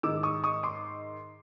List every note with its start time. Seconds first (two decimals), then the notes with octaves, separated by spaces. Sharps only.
0.03 G#2 D#3 D6 E6
0.23 C#6 D#6
0.44 C#6 D#6
0.63 C6 D6